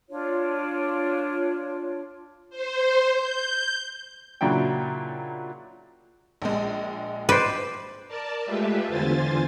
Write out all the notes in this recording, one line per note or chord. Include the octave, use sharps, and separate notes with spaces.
D4 F4 C#5
C5
G6
A#2 C#3 F#3 D4 E4 G5
A#1 G#3
B4 C5 D5
A#4 D5 A5
G#3 A3 F4 G4 B4 E5
E2 D3 F4 C5 G#5 A6